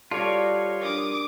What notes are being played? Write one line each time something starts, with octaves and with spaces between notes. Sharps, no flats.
G3 F4 F#4 A4 C#5 A5
D4 A#4 D6 D#6